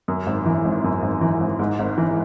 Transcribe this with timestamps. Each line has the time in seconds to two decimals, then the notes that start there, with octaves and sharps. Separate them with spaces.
0.08 F#2
0.26 G#1
0.46 E3
0.65 G#1
0.84 F#2
1.02 G#1
1.21 E3
1.40 G#1
1.59 G#2
1.79 G#1
1.98 E3